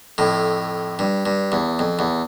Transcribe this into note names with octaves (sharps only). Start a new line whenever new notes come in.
F2 A2
G2
G2
E2
F2
E2